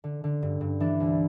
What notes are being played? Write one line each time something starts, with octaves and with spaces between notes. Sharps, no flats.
D3
D3
G2
G2
E3 D4
C2